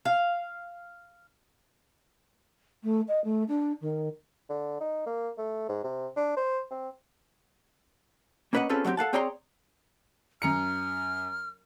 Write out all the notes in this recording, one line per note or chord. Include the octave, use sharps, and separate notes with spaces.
F5
A3
D#5
A3
D4
D#3
D3
D#4
A#3
A3
G#2
C3
D4
C5
C4
A#3 C#4 B4 C#5 D#5 F#5
C4 C#4 F4 G#4 A4 B4
F#3 G#3 B3 C4 G4
A4 F5 F#5 A5
C4 G#4 C#5 D5 A#5 C6
F#2 A#5 F6 C#7